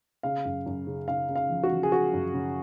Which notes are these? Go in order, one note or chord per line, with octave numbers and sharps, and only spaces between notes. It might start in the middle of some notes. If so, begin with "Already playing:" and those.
C#3 F5
F#2
F#2
C#3
C#3 F5
C#3
F5
F3
F#4
F3
G#4
C#3 F#4
F#2
C#3